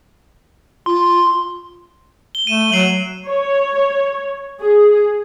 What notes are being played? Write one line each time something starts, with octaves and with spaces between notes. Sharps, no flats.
F4 C6
G7
A3 D#7 E7
F#3 C7 D7 F#7
C#5
G#4